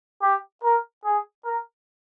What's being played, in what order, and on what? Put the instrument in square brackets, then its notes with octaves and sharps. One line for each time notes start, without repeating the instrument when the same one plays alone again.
[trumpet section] G4
A#4
G#4
A#4